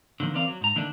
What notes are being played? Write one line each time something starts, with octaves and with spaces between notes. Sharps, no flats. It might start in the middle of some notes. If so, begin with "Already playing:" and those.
D3 D#3 F3 A#3
E3 C4 C#4 A#4 D5 F5
F#3
G#2 A#5
D3 D#3 A3 A#3 D4